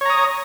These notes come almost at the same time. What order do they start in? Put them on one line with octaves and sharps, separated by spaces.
C#5 A#5 D#6